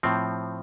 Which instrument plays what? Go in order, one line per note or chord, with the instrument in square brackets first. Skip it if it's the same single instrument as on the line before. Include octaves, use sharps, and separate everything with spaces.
[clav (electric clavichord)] A2 F3 C4